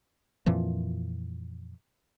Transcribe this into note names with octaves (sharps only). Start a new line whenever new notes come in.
F2 A#2 E3 F3